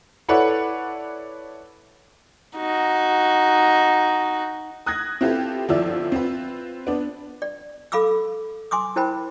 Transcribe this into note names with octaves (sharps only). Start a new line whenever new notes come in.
E4 A4 B4 C#5 D5 F#5
D#4 F#4
D#6 F#6 G#6 A#6
C4 E4 F4 G4 A4 B4
G1 F3 E4 F4 D5 E6
C4 F4 B4
B3 D4
D5
A4 F5 B5 D6 E6
G#5 C6 D6 D#6
E4 A#4 C5 G5 B5